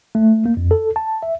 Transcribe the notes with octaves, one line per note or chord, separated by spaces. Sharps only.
A3
A#3
F2
A4
A5
E5